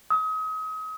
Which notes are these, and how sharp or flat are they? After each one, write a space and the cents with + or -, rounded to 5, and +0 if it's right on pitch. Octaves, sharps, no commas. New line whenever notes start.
D#6 +35